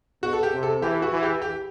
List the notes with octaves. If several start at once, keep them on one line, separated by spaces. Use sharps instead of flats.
B2 F#4
A4
G4
C3
A4
E3 G4
F#4
E3
G4
G4